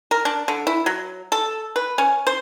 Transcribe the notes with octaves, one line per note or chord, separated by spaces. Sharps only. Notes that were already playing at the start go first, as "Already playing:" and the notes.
A#4
D4
D3
E4
F#3
A4
B4
C#4
C5